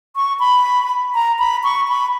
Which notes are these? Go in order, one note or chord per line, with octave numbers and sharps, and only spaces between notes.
C#6
B5
A#5
B5
C#6
B5